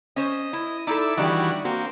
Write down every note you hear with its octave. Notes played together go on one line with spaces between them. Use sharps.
C#4 C5 D#5
E4
D#4 E4 A4 D5 E5
D#3 E3 G3 D4 F#4 G4
A#3 C4 F#4